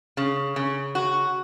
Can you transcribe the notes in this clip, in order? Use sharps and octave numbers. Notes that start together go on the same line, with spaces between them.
C#3
C#3
F#4